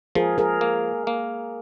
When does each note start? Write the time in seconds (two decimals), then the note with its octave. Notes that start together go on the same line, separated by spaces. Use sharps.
0.15 F3 G#4 A#4
0.38 G#4 A#4
0.61 A#3
1.07 A#3